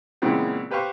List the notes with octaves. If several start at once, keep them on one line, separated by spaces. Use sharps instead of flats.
A#2 C#3 E3 G#3 B3 C4
G4 B4 C5 F5 C#6